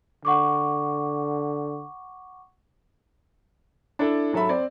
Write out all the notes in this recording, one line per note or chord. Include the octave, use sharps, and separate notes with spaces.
D3 F#5 C#6 D6
D4 E4 A4
G#2 F#3 A4 E5 B5
C4 D5